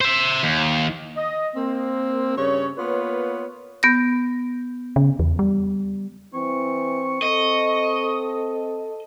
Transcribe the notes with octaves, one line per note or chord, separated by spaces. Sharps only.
C5 E5
D#2
D#5
A#3 C4
G2 C#3 C#5
A#3 B3 F4 B4 C#5
B3 G6 A#6
C#3
E2
G3
E3 C4 C#6
C4 A4 D#5